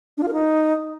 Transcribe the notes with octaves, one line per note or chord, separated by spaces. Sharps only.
D4
F4
A#4
D#4